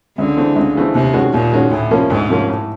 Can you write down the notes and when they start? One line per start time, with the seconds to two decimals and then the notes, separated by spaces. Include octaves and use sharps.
0.18 C#2 D3
0.37 C#3 E3 A3 C4
0.56 C#2
0.76 C#3 E3 A3 C4
0.95 D#2 C3
1.14 D#3 G#3 C#4 F#4
1.33 D#2 A#2
1.52 D#3 G#3 C#4 F#4
1.71 D2 A2
1.90 C3 F3 A#3 C#4
2.10 D2 G#2
2.29 C3 F3 A#3 C#4
2.48 A2